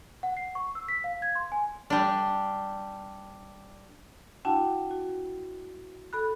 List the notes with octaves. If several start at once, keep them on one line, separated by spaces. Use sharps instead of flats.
F#5
C7
C#6
E6
B6
F5
G#6
C6
G#5
G3 D4
D4 E4 F#4 F#5 G5 A5
F#4
A4 B5 F#6